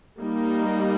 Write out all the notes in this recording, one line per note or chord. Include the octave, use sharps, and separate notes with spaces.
G3 A#3 D#4